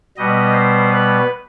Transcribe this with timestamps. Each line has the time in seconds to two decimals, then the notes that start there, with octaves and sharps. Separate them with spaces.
0.17 B2 G3 B3 D#5
0.53 C5
0.90 B4